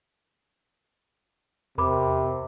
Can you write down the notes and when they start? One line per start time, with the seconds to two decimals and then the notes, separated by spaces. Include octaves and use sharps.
1.78 E2 C3 A#4 B5 D6